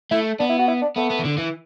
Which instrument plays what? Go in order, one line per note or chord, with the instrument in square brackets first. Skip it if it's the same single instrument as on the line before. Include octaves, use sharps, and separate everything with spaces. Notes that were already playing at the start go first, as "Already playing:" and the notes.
[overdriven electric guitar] A3 [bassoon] E4
[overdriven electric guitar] B3 [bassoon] D4
[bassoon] E4
F#4
E4
D4
[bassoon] A3 [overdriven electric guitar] B3
[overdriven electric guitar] B3
E3
D3
E3